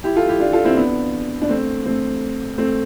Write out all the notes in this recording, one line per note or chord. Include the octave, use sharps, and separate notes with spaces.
E4 G4
F4 A4
E4 G4
D4 F4
F4 A4
C4 E4
B3 D4
D4
A3 C4
A3 C4
A3 C4